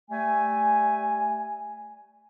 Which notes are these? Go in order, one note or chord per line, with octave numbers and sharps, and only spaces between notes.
G3 A3 G#5